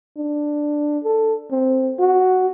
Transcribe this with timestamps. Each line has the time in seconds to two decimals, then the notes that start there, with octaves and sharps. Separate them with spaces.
0.17 D4
1.04 A4
1.51 C4
1.99 F#4